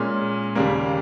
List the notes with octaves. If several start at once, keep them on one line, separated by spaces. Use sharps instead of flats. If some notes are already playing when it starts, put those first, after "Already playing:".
Already playing: A#2 G#3 C#4
D#2 C#3 G3 A#3